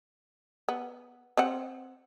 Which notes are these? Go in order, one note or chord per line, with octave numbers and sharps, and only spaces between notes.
B3
C4 C5 F#5